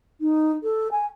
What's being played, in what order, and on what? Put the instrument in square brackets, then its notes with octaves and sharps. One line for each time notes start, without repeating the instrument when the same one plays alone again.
[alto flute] D#4
A4
G#5